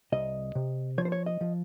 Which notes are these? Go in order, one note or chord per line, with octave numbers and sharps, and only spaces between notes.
C2 D#5
C3
F3 C#5
C5
C#5
D#5
F3